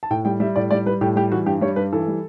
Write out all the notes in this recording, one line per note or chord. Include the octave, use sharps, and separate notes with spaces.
A5
A2 G5
G3 G5
G3 E5
A2 D5
G3 D5
G3 B4
A2 G4
G3 G4
E3 F#4
G2 G4
G3 C#5
G2 B4
E3 A4
G3